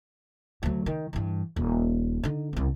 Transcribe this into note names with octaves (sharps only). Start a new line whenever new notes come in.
D2 F#3
D#3
G2 E3
D#1
D3 D#4
C2 C4